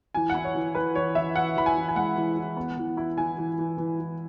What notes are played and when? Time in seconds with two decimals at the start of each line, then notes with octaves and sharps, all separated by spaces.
0.14 E3 G#5
0.30 E4 F#5
0.44 C#5
0.55 E3
0.75 E3 B4
0.95 E3 C#5
1.15 E3 E5
1.36 E4 F#5
1.56 E3 B5
1.66 G#5
1.76 E3
1.88 G#5
1.96 G#3 F#5
2.16 E3
2.37 E3
2.57 B3
2.77 E3
2.97 E4
3.17 E3 G#5
3.37 E3
3.58 E3
3.77 E3
3.99 E3